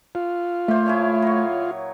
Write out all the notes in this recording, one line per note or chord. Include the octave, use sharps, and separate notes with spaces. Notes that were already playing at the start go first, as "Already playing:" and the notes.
F4
A#2 A3 C5
E4 G#4 C#5
F#3 C#6